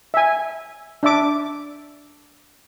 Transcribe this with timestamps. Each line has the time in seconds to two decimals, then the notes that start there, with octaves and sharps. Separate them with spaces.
0.14 E5 G#5
1.03 D4 E5 D6